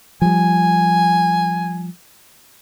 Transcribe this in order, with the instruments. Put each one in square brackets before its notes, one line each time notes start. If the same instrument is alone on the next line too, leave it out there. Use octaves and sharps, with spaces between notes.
[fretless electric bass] F3 G3 [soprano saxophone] G#5